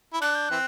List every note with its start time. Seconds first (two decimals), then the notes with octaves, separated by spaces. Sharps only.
0.13 E4
0.21 D4 F#6
0.35 G6
0.49 E3 C4 F#6